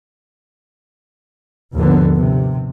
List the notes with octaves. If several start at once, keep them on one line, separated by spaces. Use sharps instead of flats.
D#2 G#2 D3 F3 B3
C3